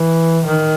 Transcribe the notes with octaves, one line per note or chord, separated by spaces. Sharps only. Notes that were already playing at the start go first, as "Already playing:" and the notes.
Already playing: E3
D#3